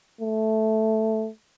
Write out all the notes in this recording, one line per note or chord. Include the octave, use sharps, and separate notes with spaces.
A3